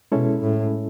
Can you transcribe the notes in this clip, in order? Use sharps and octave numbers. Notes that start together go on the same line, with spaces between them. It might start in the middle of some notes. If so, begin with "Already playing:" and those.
B2 G#3 C#4 E4 A4
A2